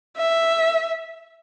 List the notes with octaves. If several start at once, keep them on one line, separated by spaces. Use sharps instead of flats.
E5